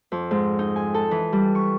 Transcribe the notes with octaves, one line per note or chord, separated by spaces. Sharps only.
F2
G#2
D#4
G#5
A4
E3
G3
C#6